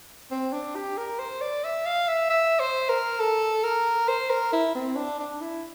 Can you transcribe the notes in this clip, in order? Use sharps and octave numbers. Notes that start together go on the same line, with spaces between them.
C4
D4
G4
A#4
C5
D5
E5
F5
E5
E5
C5
A#4
A4
A#4
C5
A#4
E4
C4
D4
D4
E4